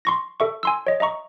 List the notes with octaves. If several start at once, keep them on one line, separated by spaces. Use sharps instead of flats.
C6 C#6 A#6
A4 E5 C#6
G#5 C6 E6
C#5 D#5
D#5 E5 A#5 C#6